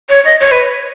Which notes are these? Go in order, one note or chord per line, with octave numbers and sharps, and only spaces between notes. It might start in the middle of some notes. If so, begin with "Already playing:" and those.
C#5
D#5
C#5
B4